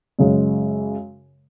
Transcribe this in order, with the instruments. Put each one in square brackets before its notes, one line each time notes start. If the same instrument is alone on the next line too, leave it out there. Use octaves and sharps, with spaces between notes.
[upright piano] F#2 C#3 G#3